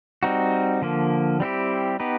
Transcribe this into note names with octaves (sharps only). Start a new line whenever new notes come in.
G3 C4 D#4 F#4
D3 F3 A#3
G3 C4 E4 G4
B3 D#4 G4 B4